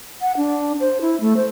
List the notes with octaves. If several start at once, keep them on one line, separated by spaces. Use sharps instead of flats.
F#5
D4
C5
E4
A3
C5